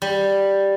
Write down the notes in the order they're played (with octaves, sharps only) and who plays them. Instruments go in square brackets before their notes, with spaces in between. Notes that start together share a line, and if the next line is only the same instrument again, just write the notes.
[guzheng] G3